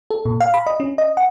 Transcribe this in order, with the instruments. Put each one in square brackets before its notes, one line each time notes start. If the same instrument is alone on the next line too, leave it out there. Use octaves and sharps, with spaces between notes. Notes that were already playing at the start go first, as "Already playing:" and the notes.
[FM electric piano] A4
A#2
F5
B5
D#5
C#4
D#5
F#5